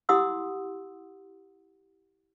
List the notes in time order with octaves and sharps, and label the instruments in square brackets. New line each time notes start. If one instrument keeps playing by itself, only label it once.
[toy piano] E4 G4 F#5 C6 D#6 E6